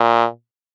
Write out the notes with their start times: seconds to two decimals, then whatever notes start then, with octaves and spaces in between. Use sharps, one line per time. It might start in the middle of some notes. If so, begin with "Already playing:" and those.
Already playing: A#2